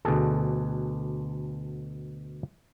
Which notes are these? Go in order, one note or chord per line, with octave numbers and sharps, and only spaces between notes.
D2 B2 G#4 A4